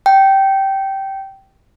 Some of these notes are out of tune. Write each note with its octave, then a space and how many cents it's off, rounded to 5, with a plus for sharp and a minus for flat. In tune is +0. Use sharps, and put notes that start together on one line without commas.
G5 -15